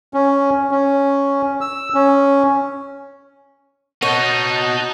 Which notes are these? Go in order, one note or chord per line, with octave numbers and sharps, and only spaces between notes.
C#4
C#4
E6
C#4
D#4 F#4 C#5 D#5 A5 F#6 G6